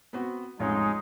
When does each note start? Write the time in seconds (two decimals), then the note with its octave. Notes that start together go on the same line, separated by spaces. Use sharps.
0.13 B3 C4 F#4
0.60 A1 F2 G#3 D#4 C#5